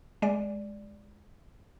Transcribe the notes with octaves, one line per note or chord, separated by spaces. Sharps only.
G#3 D5